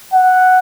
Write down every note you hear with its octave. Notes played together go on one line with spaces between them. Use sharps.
F#5